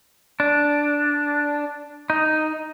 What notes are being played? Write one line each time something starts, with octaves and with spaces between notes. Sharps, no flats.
D4
D#4